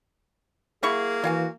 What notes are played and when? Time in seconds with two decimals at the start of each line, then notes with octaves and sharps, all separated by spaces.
0.83 F#3 A#3 E4 G#4 C#6
1.24 E3 F#4 C#5 F5 G#5